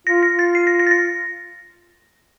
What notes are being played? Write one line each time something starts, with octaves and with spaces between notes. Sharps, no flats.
F4 A#6
A#6
F4
A6
C7
A#6
A#6
A6
A#6